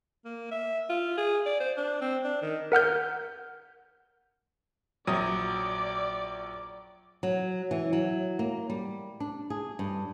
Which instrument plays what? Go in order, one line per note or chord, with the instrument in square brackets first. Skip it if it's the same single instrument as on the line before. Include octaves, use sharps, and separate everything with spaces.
[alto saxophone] A#3
E5
F4
G#4
D5
C5
D4
C4
D4
D#3
[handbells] A#4 F#5 F6 G6
[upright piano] A#1 F#3 D#6 [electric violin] D5
[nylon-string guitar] F#3
E3
F#3
A#3
G3
D4
G#4
G2